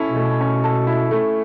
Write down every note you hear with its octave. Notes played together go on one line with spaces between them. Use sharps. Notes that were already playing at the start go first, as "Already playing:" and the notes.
Already playing: C#4 E4 A4
B2
A3
C#4
A4
E4
A3